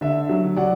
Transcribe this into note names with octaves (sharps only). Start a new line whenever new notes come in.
D3 E5
F#3
F#3 D5 F#5